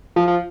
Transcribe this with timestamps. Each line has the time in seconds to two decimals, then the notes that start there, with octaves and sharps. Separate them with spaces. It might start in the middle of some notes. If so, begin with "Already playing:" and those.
0.16 F3
0.28 F3